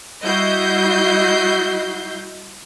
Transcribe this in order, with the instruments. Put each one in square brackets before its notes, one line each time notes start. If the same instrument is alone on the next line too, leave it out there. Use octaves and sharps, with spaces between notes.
[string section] G3 E4 F#4 D#5 G6 C7